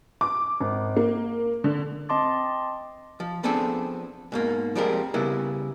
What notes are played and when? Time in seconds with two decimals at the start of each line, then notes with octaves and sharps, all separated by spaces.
0.21 D6
0.60 G#1
0.96 A#3
1.64 D3
2.09 C4 D#5 A5 C6 D6 A6
3.20 F3
3.43 F3 B3 C4 D4 G#4 A4
4.32 G#2 B2 A#3
4.75 F3 G3 G#3 C4 G#4 A#4
5.14 C#3 G3 B3 E4 G#4 A#4